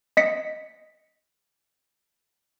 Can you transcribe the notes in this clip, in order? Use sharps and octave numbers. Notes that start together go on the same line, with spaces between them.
D#5 B6 C#7